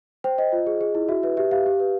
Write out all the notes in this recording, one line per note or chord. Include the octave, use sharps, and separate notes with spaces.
C5 G5
C5 D#5
F4
G#4
G#4
E4
F#4 E5
B4 E5
G4 E5
G4 F5
G4
B4